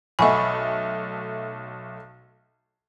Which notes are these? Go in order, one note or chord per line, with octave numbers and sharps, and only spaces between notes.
B1 A3 D#5 F#5 G#5 B5 C#6